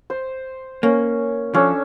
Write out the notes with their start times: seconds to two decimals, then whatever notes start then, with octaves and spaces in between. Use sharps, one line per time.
0.10 C5
0.83 A#3 C#4
1.54 F3 C#4 D4 A4